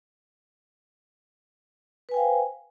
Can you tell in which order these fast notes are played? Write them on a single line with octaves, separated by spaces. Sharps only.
B4 G#5 G5 F5 C5